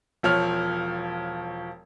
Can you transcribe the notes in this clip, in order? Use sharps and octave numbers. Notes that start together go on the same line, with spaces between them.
E1 F3 C#5 F6